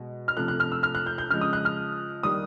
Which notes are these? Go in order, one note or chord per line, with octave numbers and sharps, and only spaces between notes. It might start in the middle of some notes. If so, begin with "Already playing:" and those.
Already playing: B2 G#3
F6
C3 F3 A3 F#6
F#6
F6
E6
F6
F#6
G6
G6
C#3 F3 G#3 F6
D#6
F#6
F6
D#3 G3 A#3 D#6